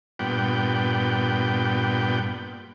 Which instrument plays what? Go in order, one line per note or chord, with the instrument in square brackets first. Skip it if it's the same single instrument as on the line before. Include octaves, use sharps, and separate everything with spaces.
[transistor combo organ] G2 A#2 B3 G5